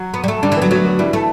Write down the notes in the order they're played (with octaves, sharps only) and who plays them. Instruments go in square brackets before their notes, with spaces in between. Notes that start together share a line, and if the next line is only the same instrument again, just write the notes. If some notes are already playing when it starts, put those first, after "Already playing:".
Already playing: [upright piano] F#3 F#4
[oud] B3
G3
A3
[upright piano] D3 D4 [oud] G3
[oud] E3
[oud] F#3 [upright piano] B3
[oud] F#3 [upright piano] A3
[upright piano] B3
[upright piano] E3 E4 [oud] G3
[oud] A3